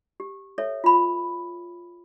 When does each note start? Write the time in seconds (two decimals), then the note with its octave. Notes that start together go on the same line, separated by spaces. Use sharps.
0.20 G4
0.58 A4 C#5 E5
0.84 F4 B5